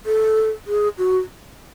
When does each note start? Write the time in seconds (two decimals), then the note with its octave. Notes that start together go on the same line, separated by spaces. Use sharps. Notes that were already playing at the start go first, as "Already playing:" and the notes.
0.06 A4
0.67 G#4
0.98 F#4